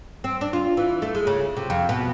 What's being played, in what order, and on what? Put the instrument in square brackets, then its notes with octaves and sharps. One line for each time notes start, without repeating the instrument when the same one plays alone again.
[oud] C4
D4
F4
E3
A3
G#3
C#3
C3
F2
B2